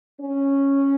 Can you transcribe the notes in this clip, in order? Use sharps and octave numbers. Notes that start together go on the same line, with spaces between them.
C#4